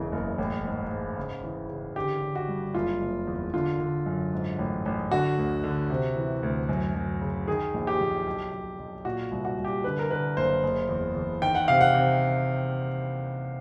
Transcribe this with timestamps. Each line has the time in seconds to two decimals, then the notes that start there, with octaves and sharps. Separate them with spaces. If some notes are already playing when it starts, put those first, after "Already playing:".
Already playing: E1 C#3 E3
0.12 F#1
0.38 A1
0.65 G#2
0.91 G#2
1.17 C#3
1.44 E3
1.69 C#3
1.96 D3 G4
2.22 D3
2.35 F#4
2.49 G2
2.75 F#1 F4
3.01 F#1
3.27 E2
3.53 D3 F4
3.80 D3
4.06 F#2
4.33 G#2
4.59 A1
4.86 A1
5.11 D3 F#4
5.38 D2
5.64 D3
5.90 C3
6.17 E3
6.43 D2
6.69 F#2
6.95 F#2
7.21 C#3
7.48 D#3 G#4
7.74 A#1
7.87 G4
8.00 A#1
8.27 B1
8.52 B1
8.79 B1
9.05 A#2 F#4
9.32 C2
9.45 F#4
9.58 C2
9.65 G4
9.84 D3 B4
9.99 A#4
10.10 D3 B4
10.37 F#1 C5
10.63 F#1
10.89 E2
11.15 E2
11.42 D#3 G5
11.55 F#5
11.68 C3 F5
11.81 F#5
11.95 C3